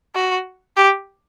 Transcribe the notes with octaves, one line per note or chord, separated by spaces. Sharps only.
F#4
G4